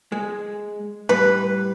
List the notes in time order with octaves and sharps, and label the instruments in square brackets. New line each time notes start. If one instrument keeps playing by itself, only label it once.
[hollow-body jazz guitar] G#3
[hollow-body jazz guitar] A2 G3 [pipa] B4